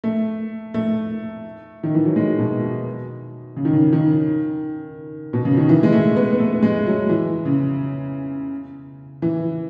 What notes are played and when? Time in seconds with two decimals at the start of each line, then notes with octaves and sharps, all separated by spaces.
0.04 A3
0.74 A3
1.83 D#3
1.95 E3
2.05 F#3
2.16 G#3
2.39 B2
3.57 C#3
3.65 D#3
3.73 C#3
3.93 D#3
5.33 B2
5.45 C#3
5.57 D#3
5.69 E3
5.83 G#3
5.92 A3
6.16 B3
6.40 A3
6.63 G#3
6.87 F#3
7.09 E3
7.45 C#3
9.22 E3